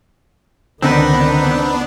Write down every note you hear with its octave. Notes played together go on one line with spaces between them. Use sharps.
C#2 D3 D#3 B3 C4 D4 D#4 B4